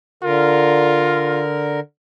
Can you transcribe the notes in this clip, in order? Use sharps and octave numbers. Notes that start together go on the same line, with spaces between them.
D3 F4 A#4